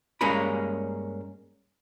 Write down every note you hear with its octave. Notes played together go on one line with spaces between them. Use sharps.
G2 G#3 A#3 C#4 A#4 B5